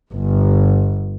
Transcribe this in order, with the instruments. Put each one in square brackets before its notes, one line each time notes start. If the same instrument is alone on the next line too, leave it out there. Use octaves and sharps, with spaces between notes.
[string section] G1